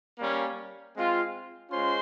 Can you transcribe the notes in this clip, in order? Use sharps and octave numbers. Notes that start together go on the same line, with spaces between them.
G3 A#3 C#4
G#3 C4 F4
G#3 C#4 F4 C5 C6